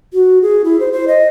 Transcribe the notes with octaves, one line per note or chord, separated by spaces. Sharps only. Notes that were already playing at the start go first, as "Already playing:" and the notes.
F#4
G#4
E4
C5
C5
D#5